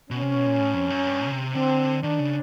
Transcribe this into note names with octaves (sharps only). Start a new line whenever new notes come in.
B2 C#4
C3
B2
A#2
A2
F2
F#2
G2
C#3
C3
D3 C4
D#3 D4
C#3